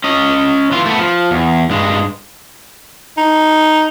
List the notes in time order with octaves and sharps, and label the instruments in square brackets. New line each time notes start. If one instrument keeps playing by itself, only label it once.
[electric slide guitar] C#4 D#5
E3 F4
A3 B3
F3
E2
G2 G#3
[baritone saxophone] D#4